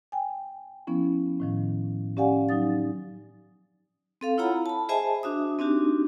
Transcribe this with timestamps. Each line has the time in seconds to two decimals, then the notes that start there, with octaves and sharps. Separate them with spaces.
0.12 G5 G#5
0.87 F3 B3 C#4 E4
1.40 A2 D#3 F3
2.17 C#4 G4 D5 F5 F#5 G#5
2.49 F#3 D#4 D#6 A6
4.21 C4 A4 F5
4.38 E4 F4 C#5 F#5 A#5 B5
4.66 A5 B5
4.89 G#4 C5 D#5 E5 G#5 A5
5.23 D4 F#4 E5 D#6
5.59 C4 D4 D#4 F#4 G4